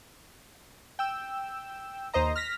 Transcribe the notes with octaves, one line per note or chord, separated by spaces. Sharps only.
G5 E6
D#2 C5 D#5 A#5
F6 A#6 B6